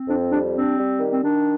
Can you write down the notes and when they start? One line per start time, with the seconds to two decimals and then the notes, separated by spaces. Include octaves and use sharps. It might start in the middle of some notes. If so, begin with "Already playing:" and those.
Already playing: C4
0.08 F2 D4
0.32 G3 D4
0.55 C4 D4
0.77 G3
1.00 D#3
1.11 C4
1.22 D#3 D4